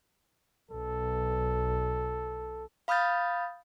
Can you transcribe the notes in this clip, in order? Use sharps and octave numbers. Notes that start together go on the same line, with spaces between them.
B1 A4
F5 B5 D#6 F6 G6 A6